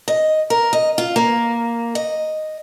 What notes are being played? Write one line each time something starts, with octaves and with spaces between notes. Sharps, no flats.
D#5
A#4
D#5
F4
A#3
D#5